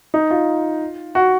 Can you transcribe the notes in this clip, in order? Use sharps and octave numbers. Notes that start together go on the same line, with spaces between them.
D#4
F4
F#4